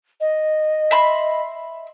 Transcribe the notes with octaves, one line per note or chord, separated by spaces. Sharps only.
D#5
E5 B5 C6